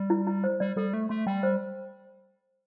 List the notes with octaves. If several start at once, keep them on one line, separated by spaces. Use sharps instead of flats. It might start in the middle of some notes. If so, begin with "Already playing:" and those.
Already playing: G3
E4
E4
C5
G3 D5
G3 A4
A3 A4
A3 C6
G3 G5
C5